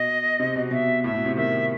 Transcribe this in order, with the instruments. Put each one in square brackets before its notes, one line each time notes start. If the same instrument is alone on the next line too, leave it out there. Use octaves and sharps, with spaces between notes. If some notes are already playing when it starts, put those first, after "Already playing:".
Already playing: [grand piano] B2 [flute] D#5
[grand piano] C3
B2
[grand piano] B2 [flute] E5
[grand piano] A2 [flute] E5
[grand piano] B2
C3
[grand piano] D#3 [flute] E5